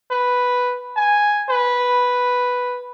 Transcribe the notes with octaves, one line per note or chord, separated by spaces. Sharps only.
B4
G#5
B4